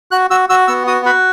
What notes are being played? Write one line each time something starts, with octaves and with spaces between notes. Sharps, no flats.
F#4 F#6
F#4 E6
F#4 E6
B3 E6
F#4 D#6
F#4 B5